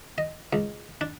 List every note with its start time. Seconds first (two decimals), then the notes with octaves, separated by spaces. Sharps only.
0.18 D#5
0.53 C#2
1.01 D4